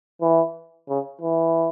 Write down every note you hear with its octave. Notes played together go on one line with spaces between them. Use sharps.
E3
C#3
E3